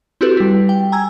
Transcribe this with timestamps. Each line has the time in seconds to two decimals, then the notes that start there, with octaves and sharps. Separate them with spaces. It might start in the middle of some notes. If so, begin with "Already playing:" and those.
0.21 C4 E4 F#4 G4 A4 B4
0.37 G3 E4
0.69 G5
0.92 G#5 A#5 E6 G#6